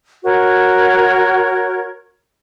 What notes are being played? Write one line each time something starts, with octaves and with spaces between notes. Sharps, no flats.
F#4 A#4 C#5